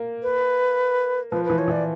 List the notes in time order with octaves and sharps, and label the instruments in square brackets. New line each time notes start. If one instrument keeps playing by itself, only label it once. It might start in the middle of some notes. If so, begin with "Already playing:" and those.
Already playing: [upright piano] A#3
[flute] B4
[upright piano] F3 [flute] B4
[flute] B4
[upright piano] E3
[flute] C#5
[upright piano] E3 [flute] D5